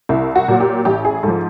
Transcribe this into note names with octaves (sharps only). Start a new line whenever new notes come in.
C2 E4
F#4
A#2 F#3
G4
A1 G4
G#4
G#2 F3 A4